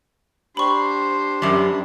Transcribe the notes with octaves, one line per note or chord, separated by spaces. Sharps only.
D4 G4 C5 B5 C#6
F#2 G3